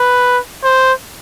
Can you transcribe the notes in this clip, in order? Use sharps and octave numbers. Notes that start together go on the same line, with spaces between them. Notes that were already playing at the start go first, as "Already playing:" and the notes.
Already playing: B4
C5